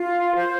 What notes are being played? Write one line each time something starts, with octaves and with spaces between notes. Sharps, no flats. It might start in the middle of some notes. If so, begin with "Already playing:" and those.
Already playing: F4
C5